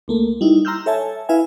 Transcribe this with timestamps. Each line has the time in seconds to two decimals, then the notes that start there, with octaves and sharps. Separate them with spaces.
0.08 C#2 A3 A#3
0.41 G3 D#4 E4
0.65 A#5 C6 E6 F6 G6
0.86 A4 C#5 E5 G#5 A5
1.29 E4 B4 E5 F5 G#5